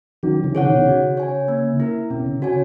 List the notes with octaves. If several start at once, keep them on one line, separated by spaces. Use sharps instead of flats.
D#3 F#3 C#4
C#3 E3
G#4 C#5 F#5
B2 D#3
D#3
C#3 F#4
C#5 G#5
A#3
E4 A#4
B2 C#4
C#3
C#3 F#4 C#5 G#5